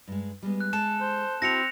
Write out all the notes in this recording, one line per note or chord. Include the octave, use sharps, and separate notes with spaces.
G2 G#3
G3 G#3 B3
F#6
G#3 A4 E7
C5
C4 E4 F#4 A#6 C#7 F7